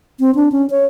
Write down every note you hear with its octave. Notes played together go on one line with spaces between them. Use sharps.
C4
D4
C#4
C#5